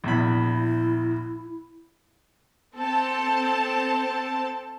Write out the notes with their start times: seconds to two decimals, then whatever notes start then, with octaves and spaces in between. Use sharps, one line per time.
0.04 A#1 E2 E4 B5
2.77 C4 A4 A5